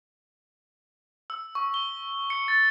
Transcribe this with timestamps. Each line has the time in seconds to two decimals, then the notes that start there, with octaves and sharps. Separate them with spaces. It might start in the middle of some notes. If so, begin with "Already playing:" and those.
1.30 E6
1.55 C#6
1.74 G7
2.30 C#7
2.48 A6